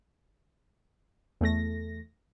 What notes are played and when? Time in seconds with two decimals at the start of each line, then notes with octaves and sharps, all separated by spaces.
1.41 E2 A3 A#6